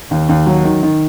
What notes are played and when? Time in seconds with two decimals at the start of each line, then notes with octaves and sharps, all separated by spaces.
0.11 D#2
0.29 D#2
0.46 F#3
0.64 D#3
0.83 D#3